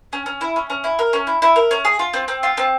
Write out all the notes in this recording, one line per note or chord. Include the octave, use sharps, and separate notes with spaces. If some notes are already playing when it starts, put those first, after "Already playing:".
C#4
C#4
E4
C#4
C#4
E4
A#4
C#4
E4
E4
A#4
C#4
G#4
F4
C4
C4
F4
C4